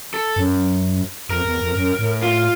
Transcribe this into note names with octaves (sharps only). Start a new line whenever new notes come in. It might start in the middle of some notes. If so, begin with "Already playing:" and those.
A4
F#2
F2 A#4
E2
F2
F#2
A2
F4